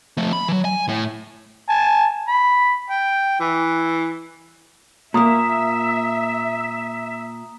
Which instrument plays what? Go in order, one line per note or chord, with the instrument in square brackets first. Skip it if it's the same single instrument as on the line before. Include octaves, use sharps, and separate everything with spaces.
[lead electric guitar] F3 A3
B5
E3 F#3
G#5
A2
[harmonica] G#5 A5
B5
G5
E3
[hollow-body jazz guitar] A#2 A#3 [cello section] E5 [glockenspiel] A#5 D#6